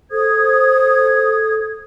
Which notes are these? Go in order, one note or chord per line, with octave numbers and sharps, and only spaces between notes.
A4 C5 D#6 G#6